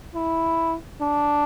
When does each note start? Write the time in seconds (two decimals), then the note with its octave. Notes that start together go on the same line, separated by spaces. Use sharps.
0.15 E4
1.02 D4